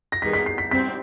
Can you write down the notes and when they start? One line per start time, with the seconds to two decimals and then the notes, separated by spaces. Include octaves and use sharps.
0.12 A#6
0.22 D#3 G3 B3 D#4 G#4 B6
0.33 B6
0.46 C7
0.58 B6
0.71 G3 C4 B6